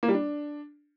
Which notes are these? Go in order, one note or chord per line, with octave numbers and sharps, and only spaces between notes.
A#3
G3
D4